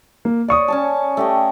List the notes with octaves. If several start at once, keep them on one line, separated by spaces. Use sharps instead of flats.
A#3
C#5 D5 C#6 D#6
C#4 G#5 A5
A3 G4 D#5